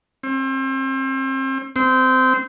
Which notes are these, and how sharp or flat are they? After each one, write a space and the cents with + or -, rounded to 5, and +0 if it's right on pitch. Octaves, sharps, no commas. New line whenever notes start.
C4 +35
C4 -20